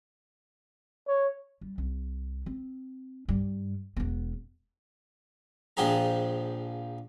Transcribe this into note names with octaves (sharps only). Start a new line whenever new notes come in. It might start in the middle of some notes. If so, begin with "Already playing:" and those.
C#5
G3
C2
C4
G2 G3
E1 B3
A#1 F3 G4 G#4 A#5